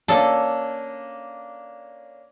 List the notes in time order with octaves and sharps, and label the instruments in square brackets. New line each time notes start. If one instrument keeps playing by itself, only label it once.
[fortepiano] A#3 C#4 D4 [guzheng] A4